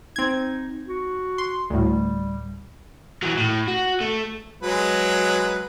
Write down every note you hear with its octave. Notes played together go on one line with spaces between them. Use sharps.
C4 D#4 G#6
F#4
C6
D2 A2 G3
E3 F#3
A2
F#4
A3
F#3 G#3 B4